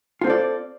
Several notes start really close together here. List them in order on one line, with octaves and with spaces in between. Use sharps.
F4 C4 A4 D5